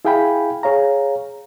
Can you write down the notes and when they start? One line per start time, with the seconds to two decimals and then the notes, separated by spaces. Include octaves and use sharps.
0.05 E4 G#4 F5 G5 G#5 B5
0.63 G#4 C#5 F5 A#5